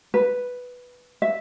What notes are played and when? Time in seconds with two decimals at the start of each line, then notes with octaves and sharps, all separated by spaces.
0.14 B4
1.22 E5